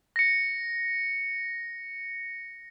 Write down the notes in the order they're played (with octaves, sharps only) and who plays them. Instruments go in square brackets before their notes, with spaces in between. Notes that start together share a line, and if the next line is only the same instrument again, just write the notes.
[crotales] A#6 C#7